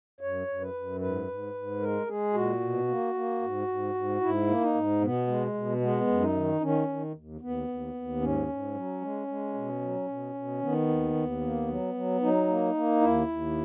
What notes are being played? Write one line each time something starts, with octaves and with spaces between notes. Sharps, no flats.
F#2 C#5
F#2
B4
F#2
G#2 B4
G#2
G#2
G#3 A#4
G#3 G#4
A#2 F#4
B2
A#3
A#3
G#2
G#2
G#2
G#2 E4
A#3
D#4
G#2
B2 B3
G#3
B2
G#3 B3
F#2
D#4
D#3
D#3 C#4
D#3
D#2
D#2 B3
D#2
D#2
G#2 C#4
G#2
F#3
G#3
G#3
B2
F#3
B2
B2
D#3 B3
D#2
D#2
A#3
F#3
F#3
F#3 D#4
A#3
A#3
D#2 E4
D#2